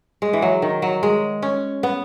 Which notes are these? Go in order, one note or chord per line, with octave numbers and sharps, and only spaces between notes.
G#3
E3
F#3
D#3
F#3
G#3
C#4
B3